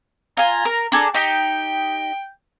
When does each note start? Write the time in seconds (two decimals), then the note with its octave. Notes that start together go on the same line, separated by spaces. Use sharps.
0.37 F4 G#5 A#5
0.65 A#4
0.92 D4 G#4 A4 A#5
1.15 D#4 G4 G5